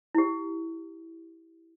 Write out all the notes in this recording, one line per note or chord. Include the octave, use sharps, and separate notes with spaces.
E4 G4